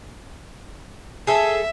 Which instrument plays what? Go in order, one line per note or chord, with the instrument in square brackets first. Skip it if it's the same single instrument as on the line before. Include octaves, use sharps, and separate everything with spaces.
[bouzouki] G#4 A4 [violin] E5